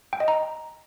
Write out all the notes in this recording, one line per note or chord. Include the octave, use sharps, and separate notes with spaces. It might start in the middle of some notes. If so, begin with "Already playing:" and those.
G5
D#5
A#5